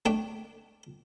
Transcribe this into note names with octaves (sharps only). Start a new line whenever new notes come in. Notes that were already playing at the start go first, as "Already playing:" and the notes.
A3 D4 G5